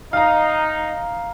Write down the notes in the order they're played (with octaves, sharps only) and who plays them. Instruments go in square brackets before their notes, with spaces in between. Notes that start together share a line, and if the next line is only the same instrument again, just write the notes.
[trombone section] D#4 [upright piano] F5 A#5